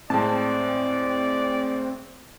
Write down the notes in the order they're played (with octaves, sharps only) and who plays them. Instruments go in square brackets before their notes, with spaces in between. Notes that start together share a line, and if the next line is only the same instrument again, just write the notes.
[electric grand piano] A2 G#3 [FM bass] C4 [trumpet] D5 [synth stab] A5